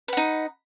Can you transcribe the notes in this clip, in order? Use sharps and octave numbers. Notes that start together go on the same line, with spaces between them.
D#4 B4 F#5